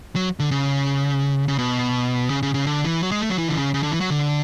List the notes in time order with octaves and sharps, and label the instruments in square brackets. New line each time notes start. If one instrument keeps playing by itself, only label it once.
[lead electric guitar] F#3
D3
C#3
C#3
B2
C#3
C#3
C#3
D3
E3
F#3
G#3
A3
F#3
E3
D3
C#3
C#3
D3
E3
F#3
D3